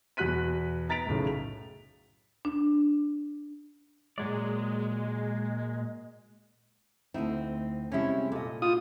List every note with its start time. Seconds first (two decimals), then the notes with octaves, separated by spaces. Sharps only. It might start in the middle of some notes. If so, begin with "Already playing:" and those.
0.17 E2 B2 F#4 F#6 B6 D#7
0.89 B3 A#5 A6 B6 D7 F7
1.07 B1 F#2 A2 C#3
1.27 F7
2.45 D4
4.18 A#2 F#3 G#3 D5
7.14 D2 A3 C4 D#4 E4
7.92 C3 G3 G#3 C#4 E4
8.32 A#2 A4 D#5
8.62 F4 D#6